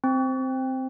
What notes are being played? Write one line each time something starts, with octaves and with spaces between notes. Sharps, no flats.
C4